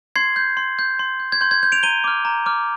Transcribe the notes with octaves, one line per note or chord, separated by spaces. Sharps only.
C6 G#6 C7
G6
C6
G6
C6
G6
G#6
C6 G6
G#6
G6
D7 F7
A#5 D#7 G7
D6 F6
A#5
D6 F6